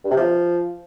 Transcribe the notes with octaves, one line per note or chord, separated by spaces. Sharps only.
G2
C3
F3